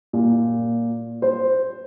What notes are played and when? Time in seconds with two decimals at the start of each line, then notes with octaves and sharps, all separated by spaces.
0.13 A#2
1.22 C5